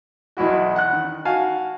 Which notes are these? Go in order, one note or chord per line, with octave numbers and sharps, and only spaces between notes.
B1 E2 E4 F#4
F#5 F#6
D#3
F#4 F5 G#5 A5